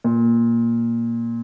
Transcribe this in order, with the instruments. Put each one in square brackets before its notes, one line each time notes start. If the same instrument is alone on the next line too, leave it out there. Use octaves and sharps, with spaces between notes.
[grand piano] A#2